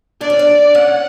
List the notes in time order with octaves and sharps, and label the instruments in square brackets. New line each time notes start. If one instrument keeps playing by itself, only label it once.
[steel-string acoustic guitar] D4 [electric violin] D5
[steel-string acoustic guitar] C#4
D4
[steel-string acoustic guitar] C#4 [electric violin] F#5